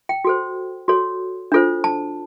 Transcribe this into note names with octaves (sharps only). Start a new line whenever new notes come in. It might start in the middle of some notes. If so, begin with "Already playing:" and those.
G5
F#4 A4 C5
F#4 A4 C#5
D4 F4 A4 C5
A5